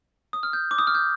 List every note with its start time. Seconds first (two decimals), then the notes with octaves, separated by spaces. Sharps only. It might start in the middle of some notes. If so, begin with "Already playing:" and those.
0.33 D#6
0.43 F6
0.53 G6
0.71 D6
0.79 D#6
0.87 F6
0.95 G6